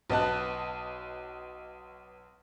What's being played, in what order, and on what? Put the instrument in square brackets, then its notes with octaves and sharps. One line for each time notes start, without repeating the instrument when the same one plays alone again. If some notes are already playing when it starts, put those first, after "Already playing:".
[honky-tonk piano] B1 B3 D#5 A5 F#6